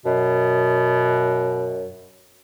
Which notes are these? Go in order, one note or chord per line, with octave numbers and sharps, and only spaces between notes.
F#2 B2